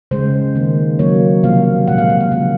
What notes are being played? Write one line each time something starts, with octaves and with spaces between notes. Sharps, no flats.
C#3 G#3 C5
D#3 A#3
C#3 F#3 A#3 C#5
C3 F3 A#3 F5
A#2 G#3 F#5
F5
F#5
F5
C#3 F3 A#3 F#5